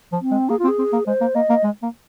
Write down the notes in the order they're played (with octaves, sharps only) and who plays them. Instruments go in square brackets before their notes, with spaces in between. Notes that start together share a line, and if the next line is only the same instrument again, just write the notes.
[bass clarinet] F3
[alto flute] C4
[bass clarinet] G#3
[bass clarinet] A#3 [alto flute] G#4
[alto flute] F4
[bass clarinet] C4
[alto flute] G#4
[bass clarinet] C4
A#3
[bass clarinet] G#3 [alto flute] C5
[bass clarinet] A#3
[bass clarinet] A#3 [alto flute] D#5
[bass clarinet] A#3
G#3
A#3